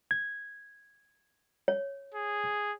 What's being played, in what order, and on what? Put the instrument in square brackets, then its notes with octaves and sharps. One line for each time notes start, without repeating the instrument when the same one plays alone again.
[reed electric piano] G#6
[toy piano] C#5
[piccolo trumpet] G#4